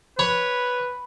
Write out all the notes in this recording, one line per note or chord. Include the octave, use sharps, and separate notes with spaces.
B4 C#5 B5